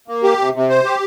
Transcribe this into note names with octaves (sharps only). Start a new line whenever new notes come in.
A#3
G4
C3
C3
C5
G4